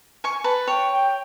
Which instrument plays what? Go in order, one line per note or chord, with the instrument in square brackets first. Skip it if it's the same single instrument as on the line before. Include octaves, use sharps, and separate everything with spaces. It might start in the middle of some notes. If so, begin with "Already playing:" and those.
[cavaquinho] G#5 C#6
B4 A5
[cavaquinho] C#5 [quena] G5
[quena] G5